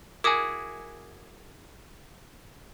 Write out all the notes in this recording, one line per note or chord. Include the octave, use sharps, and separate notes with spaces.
E4 F#4 G#4 A#4 G#5 D6 D#6